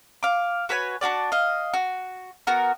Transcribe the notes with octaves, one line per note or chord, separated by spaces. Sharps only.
F5 D6
F#4 B4 C#5 G#5
D4 F#4 G4 D5
D#5 F5
F#4
B3 F#4 A#4